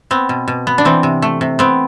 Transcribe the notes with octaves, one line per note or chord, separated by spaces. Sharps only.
B3 C4
B2
B2
B3
D4
E3 C4
C3
A3
C3
B3 C4